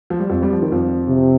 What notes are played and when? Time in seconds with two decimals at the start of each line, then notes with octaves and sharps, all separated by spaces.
0.10 F3
0.19 G3
0.30 F2 F3
0.42 G3
0.52 F3
0.62 D#3
0.72 F2 F3
1.08 C3